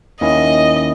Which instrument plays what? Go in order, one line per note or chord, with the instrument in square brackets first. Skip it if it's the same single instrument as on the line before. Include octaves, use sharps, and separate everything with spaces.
[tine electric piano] D#2 D#3 A#3 C#4 E4 [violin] D#5